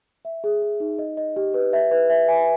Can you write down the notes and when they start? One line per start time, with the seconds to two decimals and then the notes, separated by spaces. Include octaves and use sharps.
0.25 E5
0.44 G#4
0.62 G#4
0.80 D#4
0.99 D#5
1.17 D#5
1.36 G4
1.54 B4
1.73 E5
1.91 B4
2.10 E5
2.28 G#5